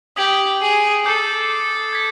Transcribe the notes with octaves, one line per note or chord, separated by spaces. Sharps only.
G4 D#6 G#6 B6 D7 F#7
G#4
A4 D6 G6 C7
G#6 B6